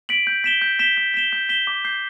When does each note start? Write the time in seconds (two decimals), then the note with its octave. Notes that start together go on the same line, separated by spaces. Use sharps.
0.09 B6 D7 F#7
0.27 G6
0.44 B6 E7 G7
0.62 G6
0.79 B6 E7 G7
0.97 G6
1.14 B6 E7 G7
1.33 G6
1.49 B6 E7 G7
1.67 D6
1.85 G6 C7 G7